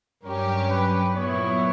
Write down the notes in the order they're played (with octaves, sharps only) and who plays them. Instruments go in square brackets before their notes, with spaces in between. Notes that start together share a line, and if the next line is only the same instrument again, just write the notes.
[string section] G2 F#3 C#4 G4 [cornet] A#4
[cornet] B4
[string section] A#2 F#3 B3 E4 [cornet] C#5